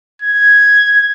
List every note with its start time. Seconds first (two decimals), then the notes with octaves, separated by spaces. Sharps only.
0.22 G#6